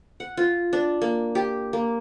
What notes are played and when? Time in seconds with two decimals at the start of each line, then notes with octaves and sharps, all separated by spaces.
0.20 F#5
0.37 F4
0.73 D4
1.02 A#3
1.35 G4
1.73 A#3